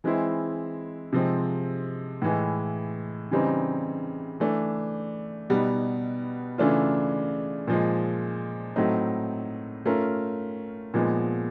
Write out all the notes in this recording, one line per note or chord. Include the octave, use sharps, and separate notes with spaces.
E3 G#3 C4 E4
C3 F3 G#3 C4
A2 E3 G#3
C#3 E3 G3 C4 D#4
E3 A3 D4
B2 G3 B3 D#4
C#3 E3 A3 D4 F4
A#2 F3 G#3
A2 F#3 A3 C4 D#4
A3 C#4 F4 A#4
A#2 F3 G#3 B3